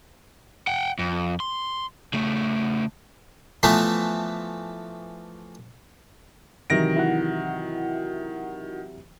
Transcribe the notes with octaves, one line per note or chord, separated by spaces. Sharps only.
F#5 G5
F2
C6
C#3 A3
E3 F3 A3 B3
C3 D#3 E3 F#3 A#6 D7
E4 F#4 F#5